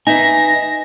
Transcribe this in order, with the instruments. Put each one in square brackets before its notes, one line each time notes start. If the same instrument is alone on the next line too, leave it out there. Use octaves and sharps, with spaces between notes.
[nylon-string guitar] D#4 [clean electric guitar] B4 E5 G#5 [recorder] A#6